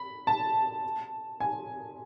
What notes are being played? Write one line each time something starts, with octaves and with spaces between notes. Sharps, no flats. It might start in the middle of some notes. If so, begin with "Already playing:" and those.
Already playing: B5
A5
G#5